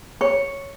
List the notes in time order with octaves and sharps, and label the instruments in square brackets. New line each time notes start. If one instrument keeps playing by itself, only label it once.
[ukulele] C#5